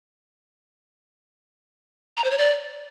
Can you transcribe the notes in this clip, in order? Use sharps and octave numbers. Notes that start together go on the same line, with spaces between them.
A#5
C5
C#5
D5